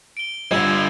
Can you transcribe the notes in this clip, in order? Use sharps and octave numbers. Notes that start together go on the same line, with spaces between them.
D7 G7
D3 G3 F4 D#5 E6 G#6